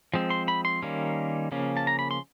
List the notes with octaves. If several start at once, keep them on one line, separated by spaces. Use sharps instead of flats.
F3 G#3 C4
C6
B5
C6
D#3 G3 A#3 C#4
C#3 F3 A#3 C#4
A5
A#5
B5
C6